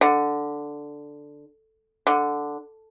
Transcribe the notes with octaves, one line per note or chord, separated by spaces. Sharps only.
D3
D3